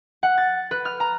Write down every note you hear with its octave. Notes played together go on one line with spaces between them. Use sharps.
F#5
A6
B4
F6
A#5